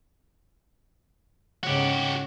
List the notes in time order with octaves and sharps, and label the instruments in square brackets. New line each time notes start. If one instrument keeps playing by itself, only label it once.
[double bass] G#2 C#3 [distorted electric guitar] F#4 G4